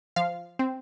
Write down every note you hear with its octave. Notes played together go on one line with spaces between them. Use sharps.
F3 F5
C4